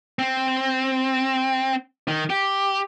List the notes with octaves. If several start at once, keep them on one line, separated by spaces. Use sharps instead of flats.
C4
D#3
G4